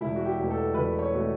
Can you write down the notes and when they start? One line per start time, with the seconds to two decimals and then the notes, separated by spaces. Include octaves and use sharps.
0.01 E1 E4
0.16 F#4
0.25 G4
0.38 E2 B2 A3
0.50 A4
0.74 E1 B4
0.99 C#5
1.13 B2 A3